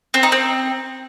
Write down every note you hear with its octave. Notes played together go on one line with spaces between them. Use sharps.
C4
D#4
C4